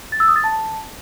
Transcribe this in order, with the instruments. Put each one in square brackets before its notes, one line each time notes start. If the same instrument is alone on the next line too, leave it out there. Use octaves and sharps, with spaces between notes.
[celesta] A6
E6
D#6
A6
A5